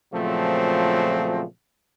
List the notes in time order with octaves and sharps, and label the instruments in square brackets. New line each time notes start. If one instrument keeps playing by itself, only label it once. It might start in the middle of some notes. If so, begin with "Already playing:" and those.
[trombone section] A#2 C#3 F3 F#3 A3 C4